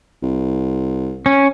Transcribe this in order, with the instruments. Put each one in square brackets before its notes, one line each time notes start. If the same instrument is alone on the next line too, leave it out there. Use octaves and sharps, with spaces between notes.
[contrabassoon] C2
[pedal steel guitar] C#4